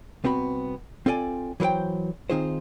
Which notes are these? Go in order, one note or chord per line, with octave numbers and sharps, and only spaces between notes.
C2 B3 C4 F#4 B5
C4 F4 A4 D5 G#5
E3 F#3 A#4 C5 G5
D#3 C4 D#4 F4 G#4 C5